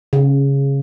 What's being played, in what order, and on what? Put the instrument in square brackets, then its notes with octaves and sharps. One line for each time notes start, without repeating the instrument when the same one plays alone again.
[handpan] C#3